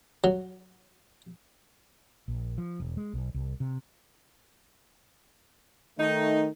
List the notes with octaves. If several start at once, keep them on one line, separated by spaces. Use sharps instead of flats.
F#3
A#1
F3
E1
G#3
B1
C2
C3
D#3 A3 D#4